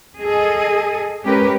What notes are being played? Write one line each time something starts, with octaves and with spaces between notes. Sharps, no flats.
G#4 A4 D#5
G#3 C#4 G4 A#4 B4